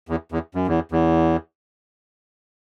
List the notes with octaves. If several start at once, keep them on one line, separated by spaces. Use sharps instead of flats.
E2
E2
F#2
E2
E2